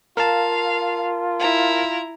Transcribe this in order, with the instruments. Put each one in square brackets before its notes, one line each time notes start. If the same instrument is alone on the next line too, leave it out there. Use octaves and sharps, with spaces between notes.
[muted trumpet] F4 [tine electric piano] A#4 A5 [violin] F5
[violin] E4 A#5